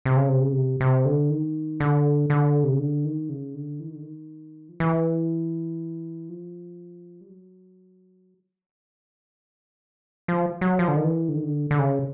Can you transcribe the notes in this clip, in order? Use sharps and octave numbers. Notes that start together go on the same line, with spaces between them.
C3
C#3
C3
C#3
C3
C3
D3
D#3
D3
D3
C3
C#3
D3
D#3
C#3
D3
E3
D#3
D3
D#3
F3
E3
F3
G3
F#3
F3
F#3
F3
D3
D#3
E3
D3
D#3
D3
D3
C#3